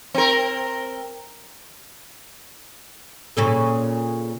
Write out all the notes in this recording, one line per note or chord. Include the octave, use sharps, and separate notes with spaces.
C4 A#4
A#2 C#3 A4